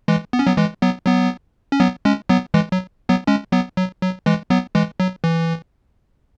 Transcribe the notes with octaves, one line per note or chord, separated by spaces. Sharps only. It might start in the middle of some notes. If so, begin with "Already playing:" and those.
E3 G#3
B3
C#4
F#3 B3
E3 G#3
F#3 B3
F#3 B3
C#4
F#3 B3
G#3 C#4
F#3 B3
E3 G#3
F#3
F#3 B3
G#3 C#4
F#3 B3
F#3
F#3
E3 G#3
F#3 B3
E3 G#3
F#3
E3